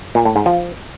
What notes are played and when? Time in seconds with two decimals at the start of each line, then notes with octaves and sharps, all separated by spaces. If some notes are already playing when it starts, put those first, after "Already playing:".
0.15 A#2
0.25 A2
0.36 G#2
0.46 F3